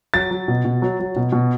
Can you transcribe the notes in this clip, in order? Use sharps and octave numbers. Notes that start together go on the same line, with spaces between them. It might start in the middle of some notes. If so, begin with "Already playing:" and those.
F#3 A6
F#3
B2
B2
F#3
F#3
B2
B2